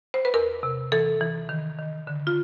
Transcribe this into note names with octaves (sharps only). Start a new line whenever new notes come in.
C5
B4
E2 A#4
C3
E3 A4
E3
D#3
D#3
D3
F4